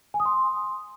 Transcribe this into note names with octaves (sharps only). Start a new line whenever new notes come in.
G#5
D#6
C6